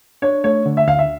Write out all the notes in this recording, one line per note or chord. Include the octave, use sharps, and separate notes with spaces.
D4 C#5
A3 C#5
D3
E5
D2 F5
E5